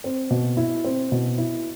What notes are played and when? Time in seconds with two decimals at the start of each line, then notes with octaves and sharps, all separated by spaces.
0.04 C4
0.30 B2
0.57 E4
0.84 C4
1.12 B2
1.38 E4